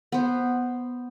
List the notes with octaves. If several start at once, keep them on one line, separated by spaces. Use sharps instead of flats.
B3 C5